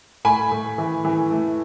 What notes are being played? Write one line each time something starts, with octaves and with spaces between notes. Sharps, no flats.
A2 G#5 B5
A2
E3
E3
A3